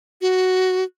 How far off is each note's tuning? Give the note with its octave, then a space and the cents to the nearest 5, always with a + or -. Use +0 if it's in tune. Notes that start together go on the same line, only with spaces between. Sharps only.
F#4 +5